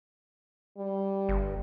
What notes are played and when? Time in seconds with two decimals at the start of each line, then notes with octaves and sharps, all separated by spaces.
0.77 G3
1.29 G1